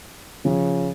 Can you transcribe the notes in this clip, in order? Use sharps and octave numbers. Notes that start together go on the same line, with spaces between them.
C#3 F3